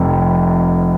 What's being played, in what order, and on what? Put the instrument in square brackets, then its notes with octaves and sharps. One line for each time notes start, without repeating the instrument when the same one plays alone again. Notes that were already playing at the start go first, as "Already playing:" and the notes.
Already playing: [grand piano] F1 F2 C3